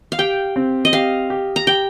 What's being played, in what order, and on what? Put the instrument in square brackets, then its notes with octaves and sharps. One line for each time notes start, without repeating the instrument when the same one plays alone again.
[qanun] F5
[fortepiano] G4 [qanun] G5
[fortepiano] C4
[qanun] D#5
[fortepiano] G4 [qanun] F5
[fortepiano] G4
[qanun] A#5
[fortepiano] G4 [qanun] G5